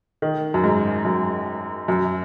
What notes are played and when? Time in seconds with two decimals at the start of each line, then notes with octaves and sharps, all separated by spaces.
0.22 D#3
0.54 F#2
0.64 G#2
1.05 F#2
1.88 F#2